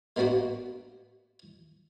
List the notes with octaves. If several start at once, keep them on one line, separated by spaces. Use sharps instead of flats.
G#3 A#3 B3 D4 F#4 F#5